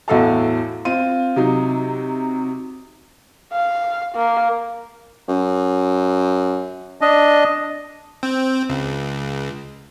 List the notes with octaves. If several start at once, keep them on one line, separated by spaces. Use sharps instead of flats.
E2 A2 F#4 A4 F5 A5
C4 F4 D#7
C3 F#3 D#4
F5
A#3
F#2
D4 D#5
C4
C#2